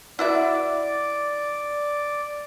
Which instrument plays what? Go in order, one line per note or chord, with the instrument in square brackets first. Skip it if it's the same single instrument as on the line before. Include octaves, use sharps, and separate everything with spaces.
[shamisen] E4 F#4 E5 [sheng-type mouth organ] D5